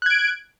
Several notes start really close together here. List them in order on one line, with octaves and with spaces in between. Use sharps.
F#6 G#6 D7